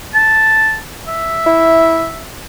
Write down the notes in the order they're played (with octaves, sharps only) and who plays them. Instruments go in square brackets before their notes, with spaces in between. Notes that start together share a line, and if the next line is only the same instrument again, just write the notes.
[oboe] A5
E5
[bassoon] E4